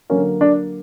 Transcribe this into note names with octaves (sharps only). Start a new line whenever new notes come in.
D3 F#3 A#3 C#4
D4